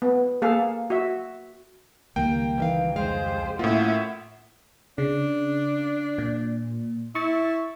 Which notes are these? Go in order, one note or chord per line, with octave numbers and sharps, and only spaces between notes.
B3
A#3 G#4 A4 F5
F#4 E5
C#2 D#3 G3 A#3 A#4 G5
E3 D#4 E5 F5
F2 G#3 G#4 C5 F5
A2 A#3 C#4 F4 E5 F#5
C#3 D4
A#2
E4 C#6 A6